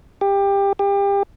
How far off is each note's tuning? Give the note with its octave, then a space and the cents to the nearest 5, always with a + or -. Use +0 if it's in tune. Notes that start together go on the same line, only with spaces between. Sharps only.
G4 +20
G4 +30